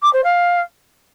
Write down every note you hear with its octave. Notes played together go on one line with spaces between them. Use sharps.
D6
C5
F5